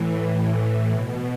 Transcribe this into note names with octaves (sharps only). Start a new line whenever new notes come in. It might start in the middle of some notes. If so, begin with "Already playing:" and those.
Already playing: A2 E3
A2 E3
B2